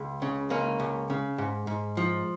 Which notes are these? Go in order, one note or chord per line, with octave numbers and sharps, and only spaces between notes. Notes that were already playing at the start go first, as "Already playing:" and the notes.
Already playing: C#2
C#3
C#2 A#3 C#4
C#2
C#3
G#2
G#2
F3